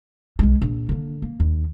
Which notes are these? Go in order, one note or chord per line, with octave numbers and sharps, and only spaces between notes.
B1 G#3
A#1
D3 A#3
A#3
D#2